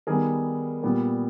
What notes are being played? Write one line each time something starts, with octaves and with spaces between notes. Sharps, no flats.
D#3 G3 B3 G#4 A#4
A#2 G3 B3